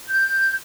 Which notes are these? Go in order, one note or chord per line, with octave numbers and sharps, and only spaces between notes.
G6